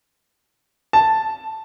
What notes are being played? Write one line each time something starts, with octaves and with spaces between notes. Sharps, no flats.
A5